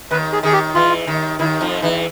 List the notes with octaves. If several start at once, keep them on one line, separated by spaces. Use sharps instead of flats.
D#2 D#3 B4
G#4
D#2 D#3 G#4
G4
E2 E3 F4
D#2 D#3
D#2 D#3 E4
F2 F3 D#4
E2 E3 D#4